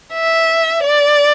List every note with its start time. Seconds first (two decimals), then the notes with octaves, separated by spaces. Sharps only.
0.14 E5
0.84 D5